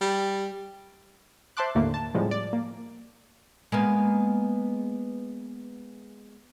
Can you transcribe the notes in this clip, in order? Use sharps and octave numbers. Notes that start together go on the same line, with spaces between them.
G3
C5 E5 A5 C6 D6 F#6
D#2 A2 D3 A3 A#3
A5
A2 C#3 F3 G3 G#3
D5
A#3
G#3 A#3 B3